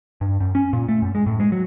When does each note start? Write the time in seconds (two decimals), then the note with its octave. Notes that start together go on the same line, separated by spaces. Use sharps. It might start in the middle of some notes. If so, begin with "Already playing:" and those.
0.21 G2
0.40 F#2
0.55 C#4
0.73 A#2
0.89 A3
1.02 F#2
1.15 G#3
1.27 A2
1.40 G#3
1.52 F#3